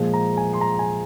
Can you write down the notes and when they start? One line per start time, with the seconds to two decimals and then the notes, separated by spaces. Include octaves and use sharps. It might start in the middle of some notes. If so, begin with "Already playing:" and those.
Already playing: A#2 F3 G#3
0.13 A#5
0.37 G#5
0.53 C6
0.61 A#5
0.79 G#5